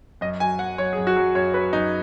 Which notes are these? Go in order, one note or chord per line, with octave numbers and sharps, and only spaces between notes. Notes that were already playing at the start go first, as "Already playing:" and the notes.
F#2 D#5
F#3 G#5
F#2 F#5
F#3 C#5
G#4
F#2
F#4
F#3
F#2 C#5
F#3 B4
F#2 D#4